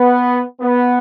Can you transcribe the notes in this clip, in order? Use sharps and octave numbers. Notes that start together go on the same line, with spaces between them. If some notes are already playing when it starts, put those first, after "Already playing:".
Already playing: B3
B3